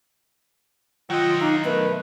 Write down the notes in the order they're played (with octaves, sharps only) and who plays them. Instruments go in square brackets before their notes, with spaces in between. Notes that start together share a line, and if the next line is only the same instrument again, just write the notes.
[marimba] D#3 [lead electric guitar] F#3 D#5 [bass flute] F4 [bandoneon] F#5 G5 E6
[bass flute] D#4 [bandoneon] F5 [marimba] A#5 D6
[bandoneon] A3 [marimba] B3 A#4 [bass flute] B4